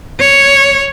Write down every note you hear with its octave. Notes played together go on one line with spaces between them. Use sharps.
C#5